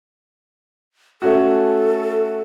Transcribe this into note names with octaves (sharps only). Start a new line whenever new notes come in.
A3 C#4 F#4 A4